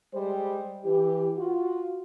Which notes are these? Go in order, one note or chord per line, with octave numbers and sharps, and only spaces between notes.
G3 G#3 C5
E3 G4
F4 F#4